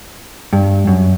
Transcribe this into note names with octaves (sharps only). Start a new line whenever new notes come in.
G2
F#2